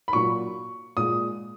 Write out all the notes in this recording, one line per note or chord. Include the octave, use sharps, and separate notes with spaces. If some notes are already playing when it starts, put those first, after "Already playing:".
B5
A#2 F#3 C#6
A#2 G#3 D#6